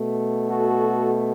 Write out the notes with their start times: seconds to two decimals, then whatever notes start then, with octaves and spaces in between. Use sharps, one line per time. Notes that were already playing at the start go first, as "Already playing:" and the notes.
Already playing: B2 A3
0.49 F#4 A4